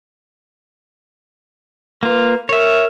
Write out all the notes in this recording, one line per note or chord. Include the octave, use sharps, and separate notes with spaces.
A#3 F4 B4
A#4 C#5 E5